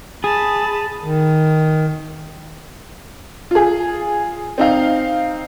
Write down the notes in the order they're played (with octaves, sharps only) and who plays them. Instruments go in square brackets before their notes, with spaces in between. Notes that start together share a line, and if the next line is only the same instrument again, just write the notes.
[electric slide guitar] G#4 [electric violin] A5 B5
[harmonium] D#3
[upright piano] F4 G#4
C4 D#4 F5